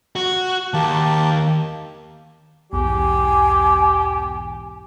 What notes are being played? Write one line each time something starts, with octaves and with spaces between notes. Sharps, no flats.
F#4
D#2 A#3 G4 A5
B1 E2 G#2 G4 G#5